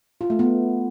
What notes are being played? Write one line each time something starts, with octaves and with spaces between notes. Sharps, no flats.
F4
A3
B3